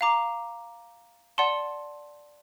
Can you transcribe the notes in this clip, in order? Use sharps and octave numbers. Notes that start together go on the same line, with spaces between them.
F5 A#5 D6
D5 F#5 A5 C6